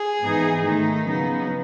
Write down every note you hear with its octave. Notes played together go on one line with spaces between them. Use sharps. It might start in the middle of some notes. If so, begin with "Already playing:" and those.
Already playing: G#4
G#2 E3 B3 D#4
D#3 A3 D#4
C#3 F#3 B3 D#4